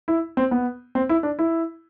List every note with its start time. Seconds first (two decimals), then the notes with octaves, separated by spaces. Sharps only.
0.08 E4
0.37 C4
0.51 B3
0.95 C4
1.09 E4
1.23 D4
1.39 E4